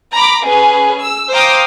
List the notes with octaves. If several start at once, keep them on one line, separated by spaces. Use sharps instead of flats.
A#5 B5 D6
C#4 G#4 B4
E6
C5 F5 G5 A#5 D6 D#6